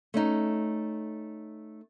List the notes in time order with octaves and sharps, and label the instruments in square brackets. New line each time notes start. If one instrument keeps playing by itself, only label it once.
[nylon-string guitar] A3 C#4 D#4